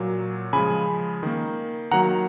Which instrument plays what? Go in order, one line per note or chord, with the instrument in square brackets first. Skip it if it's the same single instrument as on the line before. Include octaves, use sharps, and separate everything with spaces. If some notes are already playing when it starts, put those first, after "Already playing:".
Already playing: [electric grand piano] A#2 F#3 A#3
C#3 F3 G#3 G#5 B5
D#3 A#3
D#3 F#3 A#3 F#5 A#5